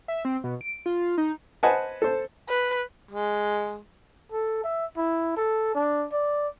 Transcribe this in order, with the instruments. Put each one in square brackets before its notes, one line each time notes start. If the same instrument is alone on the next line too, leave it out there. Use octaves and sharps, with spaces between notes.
[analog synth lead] E5
C4
B2
D7
F4
D#4
[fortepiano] B4 C5 D#5 F#5 G#5 A5
A4 C5
[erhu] B4
[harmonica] G#3
[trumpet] A4
E5
E4
A4
D4
D5